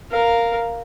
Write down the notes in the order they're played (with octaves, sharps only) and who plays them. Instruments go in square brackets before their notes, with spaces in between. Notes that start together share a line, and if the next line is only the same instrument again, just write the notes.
[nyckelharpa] A#4 F5